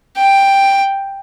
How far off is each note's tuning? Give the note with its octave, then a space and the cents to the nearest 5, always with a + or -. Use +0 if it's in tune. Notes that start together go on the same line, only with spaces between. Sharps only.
G5 +5